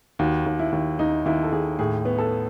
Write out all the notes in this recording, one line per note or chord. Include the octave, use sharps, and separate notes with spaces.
D#2 F#4
D#2
E4
D#2
D#2 D#4
D#2 E4
A4
D#2 G#4
A2 G#4
B3
A4